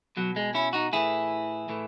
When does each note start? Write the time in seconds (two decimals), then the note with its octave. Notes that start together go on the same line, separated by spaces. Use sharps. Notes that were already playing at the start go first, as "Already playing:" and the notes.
0.17 B2 F#3
0.36 G#3
0.54 C#4 E4
0.73 D#4 F#4
0.93 A2 E3 E4 G#4
1.69 A2 E3